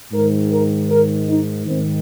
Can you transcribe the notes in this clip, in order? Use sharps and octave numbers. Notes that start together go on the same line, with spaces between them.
G#2 D#3 A#4
A#4
A#4
D#4
G#2 D#3 C4